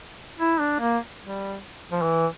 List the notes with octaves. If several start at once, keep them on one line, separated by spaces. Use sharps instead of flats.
E4
D4
A#3
G3
F3
E3